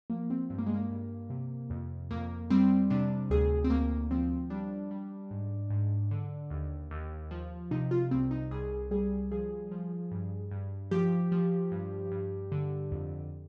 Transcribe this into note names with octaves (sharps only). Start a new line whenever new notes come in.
F3 A#3
C4
G2 C4
A#3
G#3
A#3
G2
C3
F2
F2 A#3
G3 C4
C3 D4
D2 G#4
C4
D2 A#3
F3 C4
G3 D4
G3
G#2
G#2
D3
D#2
D#2
F3
C3 D#4
F4
C2 C4
D#4
C2 G#4
G3 G#4
F3 G#4
F3
G2
G2
F3 G4
F3
G2
G2
D3
F2